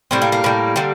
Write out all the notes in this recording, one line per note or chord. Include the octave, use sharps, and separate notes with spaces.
A2 G3 C4
A#3
A#3
A2 G3
D3 G3